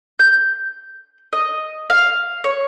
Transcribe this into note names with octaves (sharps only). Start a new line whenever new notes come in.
G6
D#5
F5
C#5